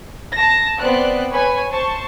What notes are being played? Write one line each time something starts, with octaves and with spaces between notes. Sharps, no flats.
A5 A#6
B3 C4 D5 F#6
B4 C#5 G#5
C5 A5 C#6